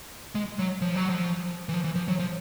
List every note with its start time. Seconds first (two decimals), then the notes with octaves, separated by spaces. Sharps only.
0.35 G#3
0.59 F#3
0.81 F3
0.95 F#3
1.09 F3
1.69 E3
1.74 F3
1.84 E3
1.95 F3
2.08 F#3
2.19 F3